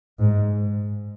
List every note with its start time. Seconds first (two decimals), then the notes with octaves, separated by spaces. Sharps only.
0.19 G#2